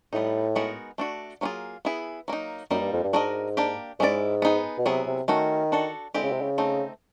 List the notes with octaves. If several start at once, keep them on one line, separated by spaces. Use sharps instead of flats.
A2 G3 B3 D#4
G#3 B3 D#4 F#4 A#4
A3 D4 F#4
F#3 A#3 C#4 F4 G#4
B3 E4 G#4
F#3 A#3 D#4
F#2 G3 A#3 D#4
G2
F2
G2
G#2 D4 F#4 A#4 D#5
A#3 D4 G4
G#2 G#3 C#4 E4 A4 D5
B3 D#4 G#4
B2
C3 F#3 B3 E4 G#4
C3
D#3 A3 C#4 F#4
D4 F#4 A4
D3 G#3 C4 E4 G4
C#3
C3
C#3
A3 C4 D#4